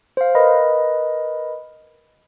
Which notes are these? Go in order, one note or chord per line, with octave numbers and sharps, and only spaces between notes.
C5 F5
A#4 B4 D#5 B5